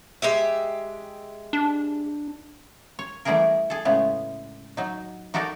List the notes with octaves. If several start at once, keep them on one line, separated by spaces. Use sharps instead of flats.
G#3 G4 E5
D4
C#5
E3 G3 A3 B3 G#4 A#4
G#4 A4
A2 C#3 G#3 A3 B3
F#3 D#4
D#4 F#4 G4 A4 A#4 D5